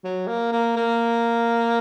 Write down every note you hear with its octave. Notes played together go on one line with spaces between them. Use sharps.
F#3
A#3
A#3
A#3